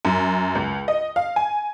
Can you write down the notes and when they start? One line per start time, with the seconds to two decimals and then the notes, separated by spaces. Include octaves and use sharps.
0.05 F#2
0.55 C#2
0.88 D#5
1.16 F5
1.36 G#5